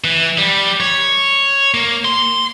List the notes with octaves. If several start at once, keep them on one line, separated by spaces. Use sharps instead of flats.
E3
G3
C#5
A#3
C6